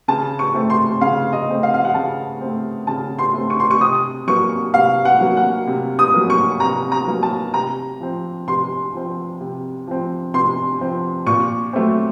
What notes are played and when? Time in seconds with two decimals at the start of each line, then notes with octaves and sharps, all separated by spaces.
0.08 C#3 A5
0.39 C#6
0.54 A3 C4
0.70 C6
1.01 C#3 F5
1.32 D#5
1.48 A3 C4
1.63 F5
1.74 F5
1.85 F#5
1.94 C#3 A5
2.41 A3 C4
2.87 C#3 A5
3.19 C6
3.34 A3 C4
3.50 C#6
3.60 C6
3.71 C#6
3.81 C3 D#6
4.27 F#3 A#3 C#6
4.74 C3 F5
5.05 F#5
5.21 F#3 A#3
5.37 F#5
5.67 C3
5.99 D#6
6.14 F#3 A#3
6.30 C#6
6.60 C3 A#5
6.92 A#5
7.07 F#3 A#3
7.23 A5
7.54 C3 A#5
8.00 F3 C4
8.48 C3 C6
8.94 F3 C4
9.40 C3
9.87 F3 C4
10.34 C3 C6
10.81 F3 C4
11.26 A#2 C#6
11.73 F#3 A3 C4